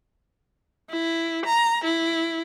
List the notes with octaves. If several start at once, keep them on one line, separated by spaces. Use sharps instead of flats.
E4
A#5
E4